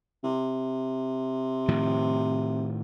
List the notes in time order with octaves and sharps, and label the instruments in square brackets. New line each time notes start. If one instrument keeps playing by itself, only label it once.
[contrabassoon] C3
[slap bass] A2 D#3 F3